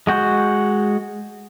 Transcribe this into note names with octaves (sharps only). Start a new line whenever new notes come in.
G#3 F#4 G6